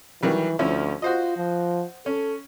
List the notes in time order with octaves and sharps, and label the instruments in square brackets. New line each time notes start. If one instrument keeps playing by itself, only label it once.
[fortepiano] D#3 F#3 G3 [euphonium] E3
[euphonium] D2 [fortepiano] F3 C#4 E4
[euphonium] F4 [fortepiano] F#4 C5 D#5
[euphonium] F3
[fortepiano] C#4 [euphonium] A4